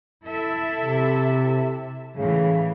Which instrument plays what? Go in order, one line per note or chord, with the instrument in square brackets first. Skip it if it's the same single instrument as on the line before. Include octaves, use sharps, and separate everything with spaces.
[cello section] E4 A4 E5
[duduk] C3
[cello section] A2 E3 [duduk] C#3